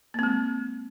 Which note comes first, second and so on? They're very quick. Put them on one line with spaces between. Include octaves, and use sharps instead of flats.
A#3 C4 G#3